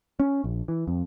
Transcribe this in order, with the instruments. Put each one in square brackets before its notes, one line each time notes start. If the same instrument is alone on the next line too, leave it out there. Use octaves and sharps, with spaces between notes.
[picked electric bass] C#4
A#1
E3
F2